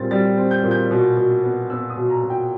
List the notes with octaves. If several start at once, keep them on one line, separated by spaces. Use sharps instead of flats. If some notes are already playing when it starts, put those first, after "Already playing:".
Already playing: A#2 G3 C4 A6
G3 A6
C4
G6
A#2
G6
B2
B2
B3
B3 E6
D#6
B2
A#5
B2
G5